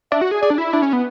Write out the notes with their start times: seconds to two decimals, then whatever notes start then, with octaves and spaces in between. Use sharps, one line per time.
0.12 D4 E5
0.21 F#4
0.31 G#4
0.42 G#4 D5
0.50 D4
0.58 E4
0.72 D4 E4
0.82 C#4
0.93 B3